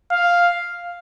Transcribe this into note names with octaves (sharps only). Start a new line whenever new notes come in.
F5